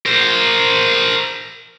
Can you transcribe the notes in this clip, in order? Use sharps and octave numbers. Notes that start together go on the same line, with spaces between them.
A#4 C5